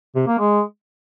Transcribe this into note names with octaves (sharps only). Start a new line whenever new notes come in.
C3
A#3
G#3